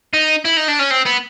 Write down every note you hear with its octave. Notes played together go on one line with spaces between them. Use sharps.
D#4
E4
D#4
D4
C#4
C4
B3